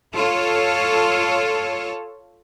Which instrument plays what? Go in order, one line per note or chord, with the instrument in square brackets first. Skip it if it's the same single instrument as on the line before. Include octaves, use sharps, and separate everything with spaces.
[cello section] F4 A4 C#5